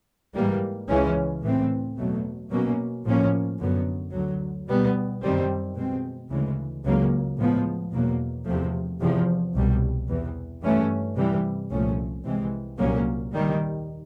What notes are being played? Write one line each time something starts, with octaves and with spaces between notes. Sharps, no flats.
G#2 E3 G3 A#3
C#2 C#3 E3 G#3 C#4
A2 E3 A3 C4
E2 B2 F#3 A3
B2 F#3 A#3 C#4
A2 F3 A#3 C#4
F#2 D3 F#3 B3
D2 D3 F#3
B2 G3 B3
F#2 D#3 G3 C4
B2 G#3 C4
D2 C#3 E3 G#3
C#2 C#3 F#3 A#3
A2 F3 G#3 B3
E2 B2 F#3 A#3
E2 C3 F3 A3
E2 C3 F3
C2 B2 G3
E2 C3 E3
G2 E3 A3 C#4
C3 E3 G3
C2 A#2 F3 A3 C#4
C2 C3 E3 G#3 C4
C2 A#2 F#3 A#3 C#4
D#2 D#3 G3